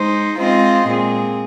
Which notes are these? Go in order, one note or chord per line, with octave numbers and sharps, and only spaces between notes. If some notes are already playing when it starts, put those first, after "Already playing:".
Already playing: G#3 D#4 C5
G#3 C4 F4 C5 D#5
A#2 G#3 C4 G#4